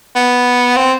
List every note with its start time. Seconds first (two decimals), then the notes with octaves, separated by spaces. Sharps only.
0.16 B3
0.77 C4